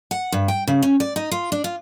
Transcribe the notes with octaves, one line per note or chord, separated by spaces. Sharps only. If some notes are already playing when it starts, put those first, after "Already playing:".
F#5
G2
G5
C#3
C#4
D5
D#4
F4
D4
F4